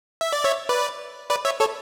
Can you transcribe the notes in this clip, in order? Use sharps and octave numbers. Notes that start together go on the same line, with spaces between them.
E5
D5
C#5 E5
B4 D5
B4 D5
C#5 E5
A4 C#5